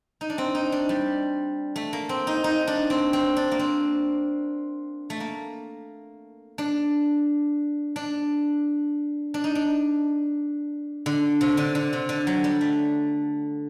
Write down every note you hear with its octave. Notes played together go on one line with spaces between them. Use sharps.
D#4
D4
C4
D#4
D4
G3
A3
A#3
C4
D#4
D#4
D4
C4
C4
D4
A#3
C4
A3
A#3
D4
D4
D4
D#4
D4
D3
C3
D3
D3
C3
D3
F#3
G3
A3